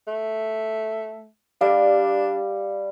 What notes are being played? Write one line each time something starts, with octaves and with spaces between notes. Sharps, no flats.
A3
G3 D4 F5